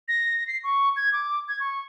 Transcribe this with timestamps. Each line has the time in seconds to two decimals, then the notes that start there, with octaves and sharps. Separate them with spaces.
0.08 A#6
0.47 C7
0.64 C#6
0.97 G#6
1.13 D6
1.48 G#6
1.60 C#6